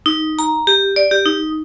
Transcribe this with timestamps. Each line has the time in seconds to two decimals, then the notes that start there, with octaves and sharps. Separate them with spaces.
0.06 D#4
0.39 A#5
0.67 G4
0.96 D5
1.11 G4
1.26 D#4